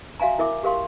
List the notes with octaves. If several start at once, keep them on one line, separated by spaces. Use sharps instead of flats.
F#4 E5 F5 G#5 A#5
E4 A#4 E5 D6
G4 A#4 F5 C6